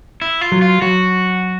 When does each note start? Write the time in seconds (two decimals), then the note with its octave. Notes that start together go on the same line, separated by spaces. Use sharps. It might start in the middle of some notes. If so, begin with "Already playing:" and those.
0.22 E4
0.41 F4
0.52 F#3
0.62 F4
0.82 F#3 F#4